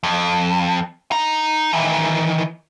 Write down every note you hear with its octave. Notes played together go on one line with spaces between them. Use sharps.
F2
D#4 A#5
D#3 E3